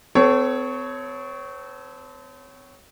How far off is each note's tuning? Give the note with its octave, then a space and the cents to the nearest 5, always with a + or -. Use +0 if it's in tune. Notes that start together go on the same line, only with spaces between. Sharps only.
C4 -40 A4 +0 C#5 +0